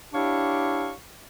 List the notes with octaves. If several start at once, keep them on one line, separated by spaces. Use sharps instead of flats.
D4 E4 G4 C#5 F5 C#6